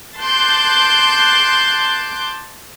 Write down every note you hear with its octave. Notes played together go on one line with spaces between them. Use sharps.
A5 C6 D6 F#6 G6